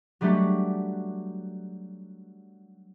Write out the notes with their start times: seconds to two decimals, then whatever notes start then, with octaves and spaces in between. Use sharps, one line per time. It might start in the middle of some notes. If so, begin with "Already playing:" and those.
0.21 F#3 G3 A3 D4 F#4 G4